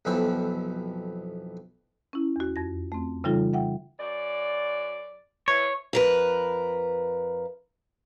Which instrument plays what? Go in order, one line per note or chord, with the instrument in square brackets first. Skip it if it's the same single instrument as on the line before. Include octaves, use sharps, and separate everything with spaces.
[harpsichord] B1 F2 E3 B4 E5 B5
[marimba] C#4 E4
E2 F#4
F2 A#6
A3 C4
C#3 E3 G3 D#4 F4 A4
E5 F#5 G5
[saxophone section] F#2 D5
[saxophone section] E3 [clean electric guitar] C#5
[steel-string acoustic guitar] F2 A#4 B4